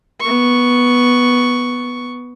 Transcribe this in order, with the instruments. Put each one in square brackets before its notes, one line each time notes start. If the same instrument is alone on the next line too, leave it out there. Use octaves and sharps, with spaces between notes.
[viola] B3 C#6